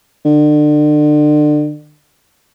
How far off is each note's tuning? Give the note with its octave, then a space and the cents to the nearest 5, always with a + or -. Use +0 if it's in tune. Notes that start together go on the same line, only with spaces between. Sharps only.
D3 +30